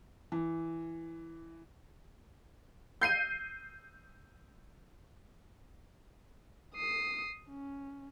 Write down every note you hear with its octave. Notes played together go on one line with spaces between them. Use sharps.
E3
G6 C7 D#7
D#6 C7
C#4